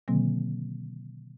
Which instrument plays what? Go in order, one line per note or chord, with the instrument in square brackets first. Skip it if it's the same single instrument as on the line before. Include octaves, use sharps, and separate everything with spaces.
[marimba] B2 D3 D#3 F#3 A#3 C4